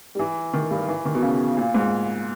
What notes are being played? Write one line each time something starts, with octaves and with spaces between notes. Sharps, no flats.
G3
E3
D#3
G2
E3
D#3
B2
C#3
A#2
G#2